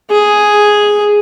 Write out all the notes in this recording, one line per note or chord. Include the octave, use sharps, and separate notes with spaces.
G#4